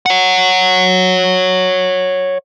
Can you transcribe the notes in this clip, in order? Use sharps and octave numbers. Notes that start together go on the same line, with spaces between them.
C#5 F#5